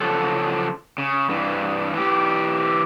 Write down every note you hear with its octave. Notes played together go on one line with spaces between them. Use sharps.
C#3 F3 F#3 A4
C#3
G2 E3
E3 G4